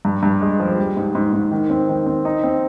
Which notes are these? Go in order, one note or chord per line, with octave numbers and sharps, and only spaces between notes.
G2
G2
G#3
F3
G3
G#2
G#2
G#2
D#3
C4
D#3
C4
D#4
C4